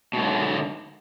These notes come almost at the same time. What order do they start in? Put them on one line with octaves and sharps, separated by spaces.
B2 G#2 F#3 B3 D3